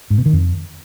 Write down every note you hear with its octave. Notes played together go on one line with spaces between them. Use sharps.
G#2
B2
D#3
F2